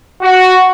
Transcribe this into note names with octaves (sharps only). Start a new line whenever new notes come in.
F#4